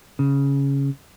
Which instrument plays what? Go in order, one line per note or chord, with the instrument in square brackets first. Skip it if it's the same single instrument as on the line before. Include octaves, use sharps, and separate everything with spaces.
[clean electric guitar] C#3